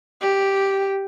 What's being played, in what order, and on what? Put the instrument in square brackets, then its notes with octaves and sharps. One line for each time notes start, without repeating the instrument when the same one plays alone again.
[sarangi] G4